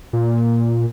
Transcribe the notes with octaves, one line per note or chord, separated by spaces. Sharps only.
A#2